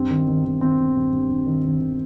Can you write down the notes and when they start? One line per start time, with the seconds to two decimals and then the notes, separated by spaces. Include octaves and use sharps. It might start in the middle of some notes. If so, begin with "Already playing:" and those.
Already playing: G2 C4
0.10 D#3
0.27 D#3
0.44 D#3
0.61 D#3 C4
0.79 D#3
0.95 G2
1.13 G2
1.30 G2
1.46 D#3
1.64 D#3
1.80 D#3